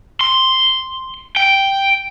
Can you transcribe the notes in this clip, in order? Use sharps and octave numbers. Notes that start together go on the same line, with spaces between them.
C6
G5